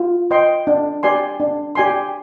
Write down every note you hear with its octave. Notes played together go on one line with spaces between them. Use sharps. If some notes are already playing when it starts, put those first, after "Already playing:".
Already playing: F4
C5 D#5 G5 C6
D4
G4 D5 G#5 C6
D4
G4 D5 G#5 C6